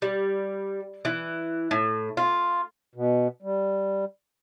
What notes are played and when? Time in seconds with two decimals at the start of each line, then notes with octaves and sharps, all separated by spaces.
0.02 G3
1.05 E3
1.71 A2
2.17 F4
2.95 B2
3.42 G3